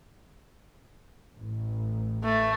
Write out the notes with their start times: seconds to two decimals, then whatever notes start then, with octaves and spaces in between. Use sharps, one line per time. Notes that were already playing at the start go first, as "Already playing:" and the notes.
1.36 A1
2.24 A3